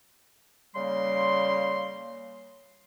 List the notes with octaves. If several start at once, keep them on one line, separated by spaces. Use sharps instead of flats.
C#3 G3 A#3 C6